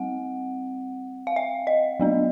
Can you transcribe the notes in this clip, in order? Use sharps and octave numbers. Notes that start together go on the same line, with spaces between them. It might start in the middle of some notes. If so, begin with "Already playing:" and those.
Already playing: G3 C4 F#5
F5
E5
D#5
F#3 B3 D4